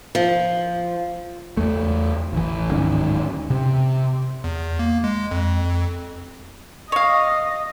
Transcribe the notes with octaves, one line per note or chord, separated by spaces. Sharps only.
F3
E2 A3
A1 E3
D1 G#2 D#3 C#4
C3
E2
A#3
G#3
F2
C#5 D#5 F5